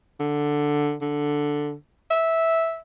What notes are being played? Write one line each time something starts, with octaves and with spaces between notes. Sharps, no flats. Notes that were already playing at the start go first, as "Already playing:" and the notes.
D3
D3
E5